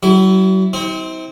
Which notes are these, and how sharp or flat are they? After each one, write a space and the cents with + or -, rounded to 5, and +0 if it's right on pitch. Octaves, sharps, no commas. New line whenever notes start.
F#3 +40 E4 +0
C4 +0 E4 -45